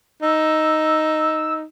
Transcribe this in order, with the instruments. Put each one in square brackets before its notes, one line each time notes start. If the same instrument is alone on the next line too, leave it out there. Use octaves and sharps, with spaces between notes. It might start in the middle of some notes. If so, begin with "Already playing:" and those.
[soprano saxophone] D#4 [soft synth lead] E6